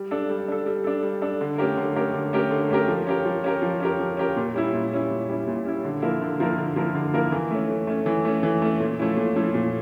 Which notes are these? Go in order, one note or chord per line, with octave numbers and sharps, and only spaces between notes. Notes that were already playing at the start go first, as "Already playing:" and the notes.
Already playing: G3
D4 A4
G3
D4 A4
G3
D4 A4
G3
D4 A4
D3
A3 C#4 G4 A#4
D3
A3 C#4 G4 A#4
D3
A3 C#4 G4 A#4
D3
A3 C#4 G4 A#4
F3
C#4 G4 A#4
F3
C#4 G4 A#4
F3
C#4 G4 A#4
F3
C#4 G4 A#4
A#2
G3 C#4 E4
A#2
G3 C#4 E4
A#2
G3 C#4 E4
A#2
G3 C#4 E4
D3
F3 A#3 E4 A#4
D3
F3 A#3 E4 A#4
D3
F3 A#3 E4 A#4
D3
F3 A#3 E4 A#4
E3
A3 C#4
E3
A3 C#4
E3
A3 C#4
E3
A3 C#4
A#2
F3 A3 C#4 E4
A#2
F3 A3 C#4 E4
A#2